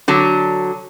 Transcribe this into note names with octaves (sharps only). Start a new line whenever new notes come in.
D3 F#3